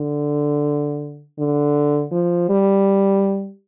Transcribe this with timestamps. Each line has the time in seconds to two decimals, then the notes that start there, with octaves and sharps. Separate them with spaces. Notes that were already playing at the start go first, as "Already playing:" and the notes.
Already playing: D3
1.39 D3
2.12 F3
2.50 G3